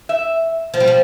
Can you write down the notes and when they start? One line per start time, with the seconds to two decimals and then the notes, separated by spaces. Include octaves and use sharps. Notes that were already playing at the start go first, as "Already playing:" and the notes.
0.09 E5
0.74 F3
0.80 G3
0.88 F3